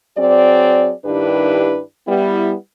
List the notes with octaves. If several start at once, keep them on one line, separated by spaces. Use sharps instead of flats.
F#3 C4 G#4 D5
G2 D#3 D4 E4 G4 B4
G3 B3 E4